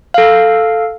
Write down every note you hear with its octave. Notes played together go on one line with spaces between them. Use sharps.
A4 F5